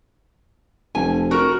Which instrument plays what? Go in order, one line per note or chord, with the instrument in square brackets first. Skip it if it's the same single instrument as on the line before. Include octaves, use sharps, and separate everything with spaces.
[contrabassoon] F1 [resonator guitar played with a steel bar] G#5
[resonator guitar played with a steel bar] F#4 A#4